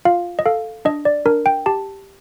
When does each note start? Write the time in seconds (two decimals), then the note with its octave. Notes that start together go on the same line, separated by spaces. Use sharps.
0.05 F4 F5
0.39 D#5
0.46 A4 F5
0.85 D4 D#5
1.05 D5
1.26 D4 A#4
1.46 G5
1.66 G4 A5